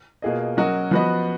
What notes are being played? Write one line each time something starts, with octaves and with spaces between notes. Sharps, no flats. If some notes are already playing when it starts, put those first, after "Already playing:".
B2 A#3 F4 G#4 D#5
F#3 C#4 F#4 A#4 D#5
F3 B3 F#4 B4 D#5